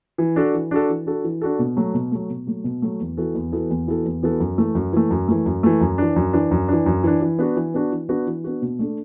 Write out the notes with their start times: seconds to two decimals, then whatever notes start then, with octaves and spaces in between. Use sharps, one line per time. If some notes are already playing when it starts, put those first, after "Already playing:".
0.18 E3
0.36 D4 F#4 A4
0.54 E3
0.71 D4 F#4 A4
0.89 E3
1.06 D4 F#4 A4
1.24 E3
1.42 D4 F#4 A4
1.59 B2
1.77 F#3 A3
1.94 B2
2.11 F#3 A3
2.30 B2
2.47 F#3 A3
2.64 B2
2.82 F#3 A3
3.00 E2
3.17 E3 B3 F#4 A4
3.35 E2
3.52 E3 B3 F#4 A4
3.70 E2
3.88 E3 B3 F#4 A4
4.05 E2
4.23 E3 B3 F#4 A4
4.40 F#2
4.58 E3 A3
4.75 F#2
4.93 E3 A3
5.11 F#2
5.28 E3 A3
5.46 F#2
5.63 E3 A3
5.81 F#2
5.98 E3 D4
6.16 F#2
6.33 E3 D4
6.51 F#2
6.68 E3 D4
6.86 F#2
7.04 E3 D4
7.21 E3
7.39 B3 D4 F#4
7.56 E3
7.74 B3 D4 F#4
7.92 E3
8.09 B3 D4 F#4
8.27 E3
8.44 B3 D4 F#4
8.62 B2
8.79 A3 D4 A4